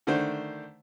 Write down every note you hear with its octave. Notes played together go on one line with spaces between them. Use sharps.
D3 D#3 A3 D4 C5